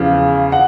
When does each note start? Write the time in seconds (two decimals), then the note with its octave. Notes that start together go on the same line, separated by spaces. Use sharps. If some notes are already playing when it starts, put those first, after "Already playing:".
Already playing: E2 C#3 F3
0.52 F#5